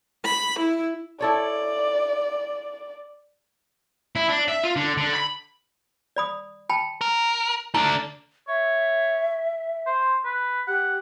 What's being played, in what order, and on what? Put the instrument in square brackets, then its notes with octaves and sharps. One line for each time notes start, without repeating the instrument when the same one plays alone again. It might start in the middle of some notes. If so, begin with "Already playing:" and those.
[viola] B5
E4
[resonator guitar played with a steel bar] E4 A4 C#5 [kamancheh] D5
[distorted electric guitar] E4
D4
E5
F4
D3
D3
B5
[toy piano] D5 B5 D#6
G5 A5 B5
[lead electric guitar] A#4
[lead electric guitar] A3 D4 [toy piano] D#4 A#5
[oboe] C#5 [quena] E5
[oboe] C5
B4
[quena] G4 [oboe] F#5